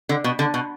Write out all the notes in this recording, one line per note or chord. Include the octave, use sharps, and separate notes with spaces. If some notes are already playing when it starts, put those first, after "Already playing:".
D3
B2
D3
B2